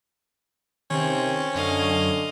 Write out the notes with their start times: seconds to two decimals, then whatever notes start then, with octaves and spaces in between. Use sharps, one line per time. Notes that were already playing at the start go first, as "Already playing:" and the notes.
0.91 C3 D#3 C4 C#4
1.55 F#2 D3 D#5 F5